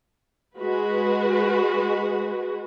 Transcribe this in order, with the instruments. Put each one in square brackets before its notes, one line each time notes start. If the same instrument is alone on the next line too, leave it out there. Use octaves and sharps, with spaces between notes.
[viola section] G#3 F#4 B4